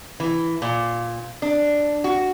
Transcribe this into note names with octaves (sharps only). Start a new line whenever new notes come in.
E3
A#2
D4
F#4